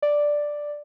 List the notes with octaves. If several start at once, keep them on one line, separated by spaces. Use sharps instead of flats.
D5